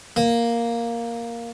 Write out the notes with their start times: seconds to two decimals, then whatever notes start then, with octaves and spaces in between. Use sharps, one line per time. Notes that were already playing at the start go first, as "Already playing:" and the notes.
0.16 A#3